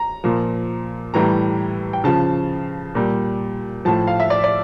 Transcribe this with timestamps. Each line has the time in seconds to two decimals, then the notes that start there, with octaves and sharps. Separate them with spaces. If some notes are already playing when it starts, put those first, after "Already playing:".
Already playing: A#5
0.24 A#2 F3
1.14 A2 E3 G3 A#5
1.93 G5
2.04 C#3 F3 A5
2.95 A#2 G3
3.85 A2 F3 A5
4.07 F5
4.20 E5
4.30 D5
4.44 D5